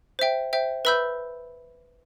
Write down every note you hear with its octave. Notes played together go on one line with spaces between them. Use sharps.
C5 E5 G5
C5 E5 G5
B4 E5 B5 E6 G6